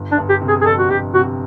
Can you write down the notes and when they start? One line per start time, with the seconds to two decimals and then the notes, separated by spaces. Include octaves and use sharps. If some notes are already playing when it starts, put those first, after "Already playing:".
Already playing: G1
0.12 D4
0.18 G1
0.29 G4
0.41 C3
0.48 G#4
0.61 G#4
0.65 F2 A4
0.78 F#4
0.90 G1 G4
1.14 C3 F#4